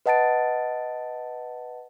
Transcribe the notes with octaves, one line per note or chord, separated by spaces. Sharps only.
B4 D#5 F#5 A5 A6 D7